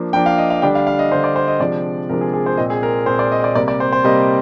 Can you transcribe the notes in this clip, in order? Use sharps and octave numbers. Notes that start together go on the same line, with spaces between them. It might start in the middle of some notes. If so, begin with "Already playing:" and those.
Already playing: F3 A#3 D4
F3 A#3 D4 G5
F5
D#5
F5
D3 G3 D4 G5
F5
F5
D#5
D3 G3 D4 C5
D5
C5
D#5
C3 F3 G#3 D4 D5
C3 F3 G#3 D4 A#4
G#4
G#4
C5
A#2 G#3 C4 D#5
G#4
A#4
A#2 G#3 C4 C5
D5
D#5
D5
C3 G3 A#3 D5
D5
C5
C5
C3 G3 A#3 D#5